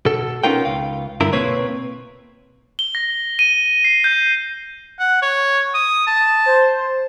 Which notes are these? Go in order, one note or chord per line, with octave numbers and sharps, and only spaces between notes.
B2 A4
B3 C#4 D#4 F4 A#4 G5
C#2 F5
G2 D3 E4 A#4
B2 A#3 C4 B4 C#5
G7
A#6
D#7
C7
G6
F#5
C#5
D#6
A5
C5